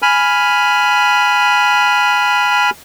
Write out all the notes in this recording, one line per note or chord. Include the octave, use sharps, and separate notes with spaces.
G#5 B5 F6